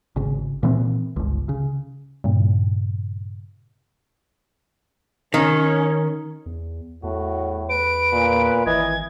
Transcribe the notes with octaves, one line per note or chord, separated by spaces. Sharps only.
G#1 C#3
A#2 E3 C4
G1 C#2
C#3
G2 A#2 C#3
D#3 C#4
E2
E2 A2 F#4
B4 D7
A#2
G#1 E3 D#5 G#6